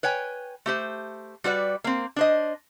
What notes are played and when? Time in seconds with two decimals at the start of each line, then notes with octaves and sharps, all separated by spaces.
0.03 B4 C#5 G5 G#5
0.66 A3 G4 C5
1.44 G3 F#4 B4 D5
1.84 A#3 C4
2.16 D4 C5 D#5